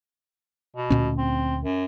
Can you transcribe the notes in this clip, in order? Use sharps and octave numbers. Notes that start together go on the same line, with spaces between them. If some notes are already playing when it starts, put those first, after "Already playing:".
B2
D2 A#2 C#4
C4
F#2